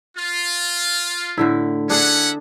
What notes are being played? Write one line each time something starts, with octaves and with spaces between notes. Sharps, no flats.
F4
A2 D3 E4
C#4 D4 G#4 E5 F#5